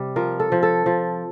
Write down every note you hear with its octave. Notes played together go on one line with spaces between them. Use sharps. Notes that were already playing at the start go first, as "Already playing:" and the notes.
Already playing: C3 G3
F3 A#4
A4
F3
A4
F3